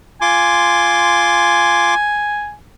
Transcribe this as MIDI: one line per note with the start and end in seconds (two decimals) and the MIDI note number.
0.21 1.94 65
0.21 2.53 80
0.21 1.94 84
0.21 1.94 86